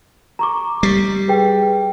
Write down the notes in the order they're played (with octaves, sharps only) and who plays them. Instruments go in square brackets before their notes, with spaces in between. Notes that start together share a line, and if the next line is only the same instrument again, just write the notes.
[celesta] A#5 C#6 D6
[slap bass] G3 [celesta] C7
[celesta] G#4 B4 G5